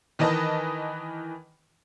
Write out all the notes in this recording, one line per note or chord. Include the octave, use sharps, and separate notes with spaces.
D#3 E3 B4 D#5 A5 D#6